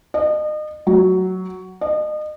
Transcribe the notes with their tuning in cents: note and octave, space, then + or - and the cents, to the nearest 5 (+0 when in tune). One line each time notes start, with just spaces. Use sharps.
D#5 -35
F#3 +5
D#5 -35